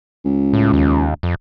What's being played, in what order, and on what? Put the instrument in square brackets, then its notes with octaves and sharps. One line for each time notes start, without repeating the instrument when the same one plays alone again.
[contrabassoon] C#2
[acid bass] A2
D#2
F2